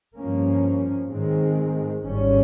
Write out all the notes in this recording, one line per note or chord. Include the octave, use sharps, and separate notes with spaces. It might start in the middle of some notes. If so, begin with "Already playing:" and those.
G2 F3 A#3 C#4
G#2 D#3 G#3 C4
G#1 G#2 G3 C#4